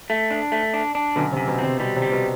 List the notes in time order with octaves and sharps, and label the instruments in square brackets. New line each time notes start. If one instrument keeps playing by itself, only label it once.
[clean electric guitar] A3
D4
A3
D4
D4
[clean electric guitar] F#2 [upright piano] B2 D3
[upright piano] C3
[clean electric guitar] F#2
[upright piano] B2
[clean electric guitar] C4
[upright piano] C3
[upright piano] B2 [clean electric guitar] G3
[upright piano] C3
[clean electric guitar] G3
[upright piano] B2